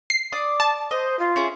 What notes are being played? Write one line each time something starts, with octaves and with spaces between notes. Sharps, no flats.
C7
D5 D6 D#6
A5
C5 D#5
F4
C#4 E4 G#4